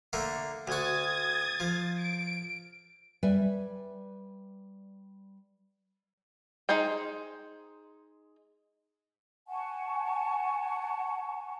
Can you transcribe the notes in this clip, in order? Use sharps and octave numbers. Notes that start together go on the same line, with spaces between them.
D3 A3 A#3
D2 F#4 D#6 G#6 A6
F3
D7
G3 B4 E5 G#5
G#3 D#4 G#4 C5 G5
F#5 G#5 A5 C#6